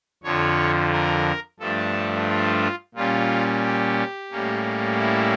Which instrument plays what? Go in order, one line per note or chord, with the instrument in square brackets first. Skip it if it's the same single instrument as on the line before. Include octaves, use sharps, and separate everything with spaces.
[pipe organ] F2 D3 F3 C#5
A#4
G2 F3 A3 D4 A4
F4
A#2 G3 C#4 F4
G4
A2 G3 A#3 C#4
E4